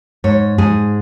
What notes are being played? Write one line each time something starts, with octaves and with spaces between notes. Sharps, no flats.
G#2 C#5
G#2 G#4